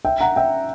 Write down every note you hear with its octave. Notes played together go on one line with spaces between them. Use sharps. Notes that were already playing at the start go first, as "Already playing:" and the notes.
E5 G5
F#5 A#5
E5 G5